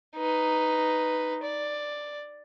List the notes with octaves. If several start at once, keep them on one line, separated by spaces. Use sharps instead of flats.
D#4 B4
D5